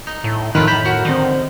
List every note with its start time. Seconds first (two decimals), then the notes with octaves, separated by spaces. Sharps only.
0.07 D#4
0.24 A2
0.55 F2 A2 D#3 F4 A#4 B4
0.68 A5 B5 G6
0.85 F#4 A#4
1.05 D3 D#3 C4